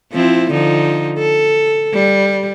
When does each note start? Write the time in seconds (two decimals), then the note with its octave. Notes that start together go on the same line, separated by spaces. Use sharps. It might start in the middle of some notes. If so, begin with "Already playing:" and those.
0.12 F3 C4 E4
0.51 D3 F3 D#4
1.18 A4
1.93 G3